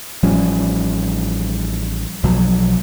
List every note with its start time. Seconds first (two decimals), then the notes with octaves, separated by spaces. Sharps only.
0.23 A1 F3 G3 C#4
2.23 B1 B2 F3 F#3